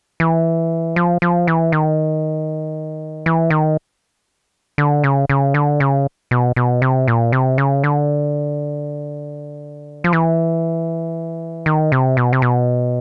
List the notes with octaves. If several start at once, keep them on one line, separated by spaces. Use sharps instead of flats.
E3
F3
F3
E3
D#3
E3
D#3
D3
C#3
C#3
D3
C#3
B2
B2
C3
A#2
C3
C#3
D3
F3
E3
D#3
C3
B2
C3
B2